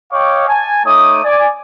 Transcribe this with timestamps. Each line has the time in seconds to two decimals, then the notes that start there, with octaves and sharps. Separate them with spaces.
0.12 C#5 D#5 F5 G5 C#6 D6
0.48 G#5 A5
0.86 A3 D#4 C#5 D6 D#6
1.24 D5 G#5